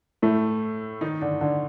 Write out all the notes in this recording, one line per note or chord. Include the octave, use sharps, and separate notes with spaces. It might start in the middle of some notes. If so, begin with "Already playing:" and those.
A2 A3
D#3 D#4
D3 D4
D3 D4